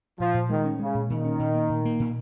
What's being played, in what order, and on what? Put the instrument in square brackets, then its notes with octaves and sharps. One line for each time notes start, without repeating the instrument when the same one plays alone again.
[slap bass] A#2 [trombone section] F3
[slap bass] A#2
[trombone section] D#3 [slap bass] G#3
[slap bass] C#4
[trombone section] C#3 [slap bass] G#3
[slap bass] A#2
[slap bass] A#2 [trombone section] D#3
[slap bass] C#4
A#2
A#3
A#2
A#3
A#2